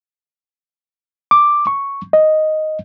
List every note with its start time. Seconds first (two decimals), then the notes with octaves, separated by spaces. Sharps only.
1.31 D6
1.67 C#6
2.13 D#5